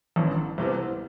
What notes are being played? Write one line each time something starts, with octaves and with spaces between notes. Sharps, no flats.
A1 G2 E3
C2 C3 E3 B3